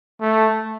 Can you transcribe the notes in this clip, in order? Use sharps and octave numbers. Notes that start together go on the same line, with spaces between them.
A3